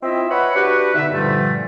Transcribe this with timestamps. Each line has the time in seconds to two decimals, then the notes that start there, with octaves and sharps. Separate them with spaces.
0.02 C4 E4 F4 D#5 E5
0.29 B4 C#5 E5 F#5 B5 C#6
0.55 D4 F#4 G4 B4
0.94 B2 D3 D#4 E5
1.11 G2 A#2 D3 F3 G3 A3